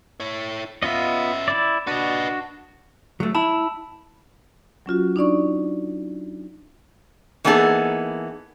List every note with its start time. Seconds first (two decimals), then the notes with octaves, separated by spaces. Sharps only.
0.20 E4 C#5
0.83 B3 C#4 F4 D#5 E5
1.48 E4 D5
1.87 D4 F#4 B4 D#5
3.20 F#3 A3
3.35 E4 A5 B5 E6
4.86 F#3 C#4 F4 F#4
5.16 D4 D#4 D5 C#6
7.44 E3 A#3 B3 D#4 G#4 A4